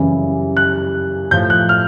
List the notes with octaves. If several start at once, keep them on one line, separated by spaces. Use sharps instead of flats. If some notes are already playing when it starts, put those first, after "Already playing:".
Already playing: F#2 C#3 E3 G3
F#6
A2 F3 G6
F#6
F6